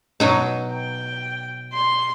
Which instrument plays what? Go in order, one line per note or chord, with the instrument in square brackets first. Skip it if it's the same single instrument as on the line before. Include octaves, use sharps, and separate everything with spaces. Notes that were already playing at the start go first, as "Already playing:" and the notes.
[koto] B2 F#3 D#4
[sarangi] G5
C6